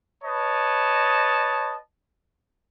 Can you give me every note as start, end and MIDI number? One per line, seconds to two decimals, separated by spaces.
0.24 1.76 71
0.24 1.76 73
0.24 1.76 75
0.24 1.76 81